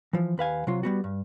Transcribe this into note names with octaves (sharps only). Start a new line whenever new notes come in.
E3 F3
D#2 B4 F5 G#5
C3 F#3 F4
G3 B3 F#4
G2